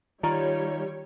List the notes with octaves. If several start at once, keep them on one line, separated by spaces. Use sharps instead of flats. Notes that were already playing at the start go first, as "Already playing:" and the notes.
D#3 G3 F4 C#5 D5 A#5